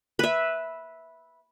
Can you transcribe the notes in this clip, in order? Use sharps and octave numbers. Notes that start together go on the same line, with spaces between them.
B4 E5